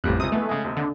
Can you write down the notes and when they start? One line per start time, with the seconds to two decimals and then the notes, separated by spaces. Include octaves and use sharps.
0.04 A1 F2 A2 G3 F#6
0.20 C#2 C3 D#6
0.32 E3 G#3 A3 B3
0.49 C#3 G#3
0.64 D#2 C3
0.77 D3